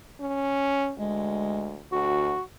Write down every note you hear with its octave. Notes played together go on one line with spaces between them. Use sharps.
C#4
D2 G#3
D2 F#4